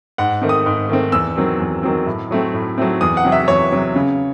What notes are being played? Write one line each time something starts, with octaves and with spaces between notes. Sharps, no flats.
G#2 F#5
D#3 A3 C4
D#6
G#2
D#3 A3 C4
E2 E6
D#3 F#3 C4
E2
D#3 F#3 C4
A2
F#3 A3 C4
A2
F#3 A3 C4
E2 D#6
F#5
C3 F#3
E5
E2 C#5
C3 F#3
C#3